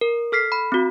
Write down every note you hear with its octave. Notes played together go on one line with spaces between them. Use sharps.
A#4
A4 F6 B6 C7
B5
C4 F#4